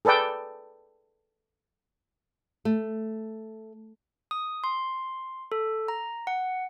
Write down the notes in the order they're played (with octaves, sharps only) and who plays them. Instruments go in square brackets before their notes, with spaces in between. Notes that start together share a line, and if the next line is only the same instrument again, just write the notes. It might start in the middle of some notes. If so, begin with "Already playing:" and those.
[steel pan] G#4 A4 B4 D5 G5
[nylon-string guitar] A3
[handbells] D#6
C6
A4
A#5
F#5